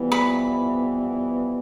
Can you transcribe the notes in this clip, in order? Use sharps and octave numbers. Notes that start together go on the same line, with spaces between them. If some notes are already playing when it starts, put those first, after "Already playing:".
Already playing: F2 E3 G3 B3 E4
B5